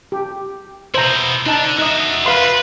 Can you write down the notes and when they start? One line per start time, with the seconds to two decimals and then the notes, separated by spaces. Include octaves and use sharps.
0.12 G4
0.94 B2 E4 C5 A#5
1.46 D3 D4 D#4 A5
1.78 D#4 F#4 E5 D#6
2.26 B4 F5 C6